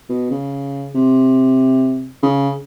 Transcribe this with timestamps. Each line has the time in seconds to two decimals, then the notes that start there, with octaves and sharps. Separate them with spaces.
0.09 B2
0.31 C#3
0.95 C3
2.23 C#3